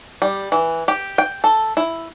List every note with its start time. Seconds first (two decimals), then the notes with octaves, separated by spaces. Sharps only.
0.22 G3
0.52 E3
0.88 G4
1.18 G5
1.44 A4
1.77 E4